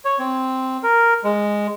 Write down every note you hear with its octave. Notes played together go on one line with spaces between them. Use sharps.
C#5
C4
A#4
G#3